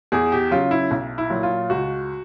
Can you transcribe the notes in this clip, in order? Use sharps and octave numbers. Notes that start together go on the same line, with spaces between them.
E2 G#4
G4
C#3 F#3 F4
E4
B1
E4
A#2 F#3
F4
C#2 F#4